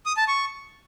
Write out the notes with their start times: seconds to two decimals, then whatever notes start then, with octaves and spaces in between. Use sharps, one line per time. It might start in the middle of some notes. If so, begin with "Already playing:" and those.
0.06 D#6
0.17 A5
0.28 C#6